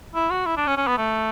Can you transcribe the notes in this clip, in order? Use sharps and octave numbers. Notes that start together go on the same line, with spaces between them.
E4
F#4
E4
D4
C#4
C#4
B3
A3